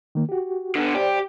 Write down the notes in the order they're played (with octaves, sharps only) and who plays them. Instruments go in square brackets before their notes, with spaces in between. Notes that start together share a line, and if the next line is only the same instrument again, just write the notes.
[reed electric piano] D#3 A#3
F#4 G4
[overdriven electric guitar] D3 B3
[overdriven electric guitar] G4 [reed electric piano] C5 D5